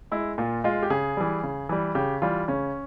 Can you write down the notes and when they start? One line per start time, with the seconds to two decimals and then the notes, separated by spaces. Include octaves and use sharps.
0.12 G#3 E4
0.38 A#2 F4
0.64 G#3 F4
0.83 G4
0.90 C#3 G#4
1.17 E3 G3
1.43 C#3
1.69 E3 G3
1.95 C#3 G4
2.22 E3 G3 F4
2.48 C#3 C#4